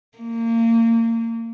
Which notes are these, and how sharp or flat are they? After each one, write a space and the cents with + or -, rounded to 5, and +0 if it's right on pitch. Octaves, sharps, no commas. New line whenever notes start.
A#3 -30